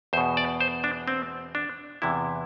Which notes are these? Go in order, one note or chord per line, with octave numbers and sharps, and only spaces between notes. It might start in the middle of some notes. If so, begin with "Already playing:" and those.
E2 B2 C5
D5
C5
D4
C4
D4
E2 C3 E3 E4